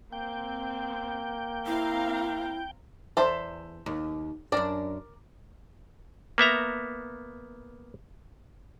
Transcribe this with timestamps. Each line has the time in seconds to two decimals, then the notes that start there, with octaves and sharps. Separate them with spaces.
0.12 A#3 C4 G5
1.67 C4 E4 F5 A#5
3.17 E2 A4 C5 E5
3.86 D#2
4.52 F#2 D4 A#4 D5
6.38 A#3 B3 E5 A#5